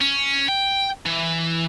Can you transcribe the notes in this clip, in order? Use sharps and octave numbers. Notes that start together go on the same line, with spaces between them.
C#4
G5
E3